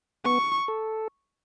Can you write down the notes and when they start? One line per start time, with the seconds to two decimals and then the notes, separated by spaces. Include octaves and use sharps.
0.25 B3 C#6
0.68 A4